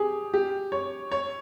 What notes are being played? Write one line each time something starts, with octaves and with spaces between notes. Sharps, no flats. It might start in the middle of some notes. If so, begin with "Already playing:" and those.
Already playing: G4 G#4
G4
C#5
C#5